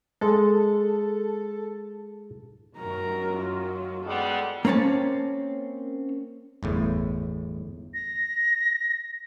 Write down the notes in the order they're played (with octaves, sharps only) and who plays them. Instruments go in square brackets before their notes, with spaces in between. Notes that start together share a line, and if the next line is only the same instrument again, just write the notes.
[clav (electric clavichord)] G#3 [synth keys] A4
[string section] F#2 D#3 F#3 [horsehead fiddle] A#4 A#5
[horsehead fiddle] F4
[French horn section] G3 G#3 B3 [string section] A4 F#5
[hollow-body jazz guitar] A#3 C4 C#4 C#5 A5
[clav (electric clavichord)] G1 E2 A2
[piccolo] A#6